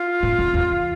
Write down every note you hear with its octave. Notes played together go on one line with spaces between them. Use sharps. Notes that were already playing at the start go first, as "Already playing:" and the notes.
Already playing: F4
A2
F2
E2